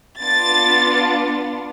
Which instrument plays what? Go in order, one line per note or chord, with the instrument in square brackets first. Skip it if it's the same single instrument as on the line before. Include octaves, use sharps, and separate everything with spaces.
[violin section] B3 D4 F4 A6